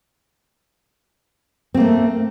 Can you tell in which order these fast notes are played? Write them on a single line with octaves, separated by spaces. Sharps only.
C4 A#3 A3